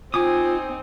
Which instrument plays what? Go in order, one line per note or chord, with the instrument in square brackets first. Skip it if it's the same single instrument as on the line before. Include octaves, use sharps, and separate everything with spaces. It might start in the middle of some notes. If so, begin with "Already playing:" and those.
[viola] C4 D#4 [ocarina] F4 [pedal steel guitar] G#5 D6 D#6